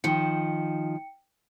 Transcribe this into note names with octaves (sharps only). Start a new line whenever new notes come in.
D#3 F3 G5 C#7